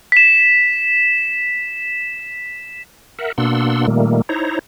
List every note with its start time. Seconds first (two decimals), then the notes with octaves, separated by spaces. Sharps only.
0.12 B6 E7
3.19 A#4 E5 F#5
3.38 B2 A#3 D4 F#5 C6 E6
3.87 A#2 D#3 G3 A3 A#3
4.29 D#4 E4 C5 C#5 A#5